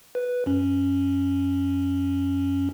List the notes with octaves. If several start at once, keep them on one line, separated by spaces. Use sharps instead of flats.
B4
F#2 C#4